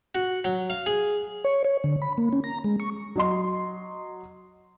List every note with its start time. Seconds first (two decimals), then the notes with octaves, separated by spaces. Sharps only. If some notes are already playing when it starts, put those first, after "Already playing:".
0.15 F#4
0.45 F#3
0.70 F5
0.86 G#4
1.44 C#5
1.64 C#5
1.84 D3
2.02 B5
2.18 A#3
2.33 C#4
2.44 A#5
2.64 G#3
2.80 C#6
3.16 F#3 D#5 C6